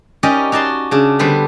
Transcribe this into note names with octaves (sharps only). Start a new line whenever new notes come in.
C#4 D#4 G4 A#4 D5 D#5
D#4 F#4 D5 A5 C6
C#3 D4
D3 G3 B3 C5 B5